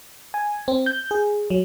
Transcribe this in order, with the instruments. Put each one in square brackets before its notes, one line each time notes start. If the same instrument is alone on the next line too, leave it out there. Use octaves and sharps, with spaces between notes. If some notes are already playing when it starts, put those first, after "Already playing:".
[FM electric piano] G#5
C4
G6
G#4
F#3